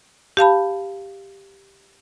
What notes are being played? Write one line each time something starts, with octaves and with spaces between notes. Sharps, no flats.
G4 F5 A5 B5